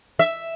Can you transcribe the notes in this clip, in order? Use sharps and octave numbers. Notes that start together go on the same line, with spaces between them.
E5